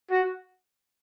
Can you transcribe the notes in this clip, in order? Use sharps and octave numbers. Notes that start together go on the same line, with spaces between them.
F#4